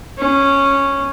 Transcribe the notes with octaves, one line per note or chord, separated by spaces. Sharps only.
C#4